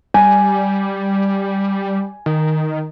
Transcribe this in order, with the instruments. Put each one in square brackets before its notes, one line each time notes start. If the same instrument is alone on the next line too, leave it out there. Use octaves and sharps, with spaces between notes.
[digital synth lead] G3 [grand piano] G#5
[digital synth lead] D#3